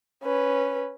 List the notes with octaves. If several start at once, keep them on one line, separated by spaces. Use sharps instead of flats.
C#4 B4